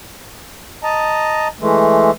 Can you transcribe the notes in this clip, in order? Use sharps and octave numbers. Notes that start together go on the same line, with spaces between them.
D#5 A5 A#5
E3 G#3 A3